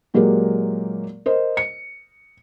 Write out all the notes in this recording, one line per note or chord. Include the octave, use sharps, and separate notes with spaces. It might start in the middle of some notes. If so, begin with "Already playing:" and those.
A#2 F#3 G#3 A#3 G4 A#4
A#4 C5 D#5
C#7